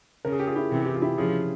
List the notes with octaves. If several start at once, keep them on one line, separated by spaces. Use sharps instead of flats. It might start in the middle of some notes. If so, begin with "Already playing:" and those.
C#3 A#4
G#4
G4
F4 G#4
E4 G4
C3 E3
G4
F4
E4 G4
C#3 F3 F4 G#4